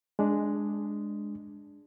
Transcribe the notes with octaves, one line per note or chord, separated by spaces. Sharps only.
G#3 D4